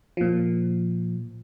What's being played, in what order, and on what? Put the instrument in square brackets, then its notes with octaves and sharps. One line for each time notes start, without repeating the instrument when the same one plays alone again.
[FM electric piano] A#2 F3